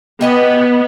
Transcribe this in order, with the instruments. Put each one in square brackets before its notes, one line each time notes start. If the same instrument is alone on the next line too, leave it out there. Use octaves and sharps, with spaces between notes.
[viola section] B3 [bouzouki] G4 D#5 G#5